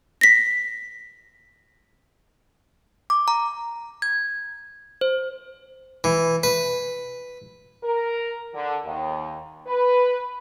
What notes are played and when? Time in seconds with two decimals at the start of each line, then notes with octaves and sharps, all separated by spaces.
0.21 A#6 B6
3.10 D6
3.28 A#5
4.02 G#6
5.01 C5
6.04 E3
6.43 B4
7.82 A#4
8.53 D3
8.84 D#2
9.67 B4